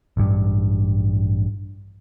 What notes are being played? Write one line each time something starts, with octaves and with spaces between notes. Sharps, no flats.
A1 G2